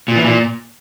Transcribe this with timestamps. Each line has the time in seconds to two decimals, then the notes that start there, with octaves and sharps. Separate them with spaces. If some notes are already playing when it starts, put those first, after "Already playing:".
0.08 A#2
0.16 E3
0.24 A#2